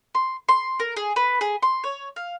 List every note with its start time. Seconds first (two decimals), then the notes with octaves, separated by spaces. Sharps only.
0.15 C6
0.49 C6
0.80 A#4
0.97 G#4
1.16 B4
1.41 G#4
1.62 C6
1.84 C#5
2.16 F5